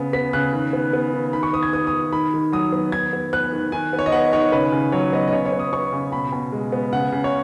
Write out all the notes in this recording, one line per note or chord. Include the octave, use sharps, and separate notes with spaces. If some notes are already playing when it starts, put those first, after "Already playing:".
Already playing: C#3 B3
B3 B6
C#3 F#6
D#3
B3
B3
D#3
D#3 B5
C#6
B3 D#6
G#6
B3 D#6
D#6
D#3
D#3 B5
D#3
F#3 D#6
B3
D#3 G#6
B3
B3 F#6
D#3
D#3 G#5
B3
C#5
D#5
B3 F#5
D#3 C#5
C#3 B4
C#3
F#3 C#5
B3 D#5
D#5
C#3 C#5
C#5
B3
D#6
B3 C#6
C#3
B2 B5
B2
G#3
B3
C#3 F#5
C#3
C#5